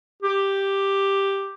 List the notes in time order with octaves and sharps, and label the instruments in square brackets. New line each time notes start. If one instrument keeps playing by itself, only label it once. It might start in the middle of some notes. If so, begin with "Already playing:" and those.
[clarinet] G4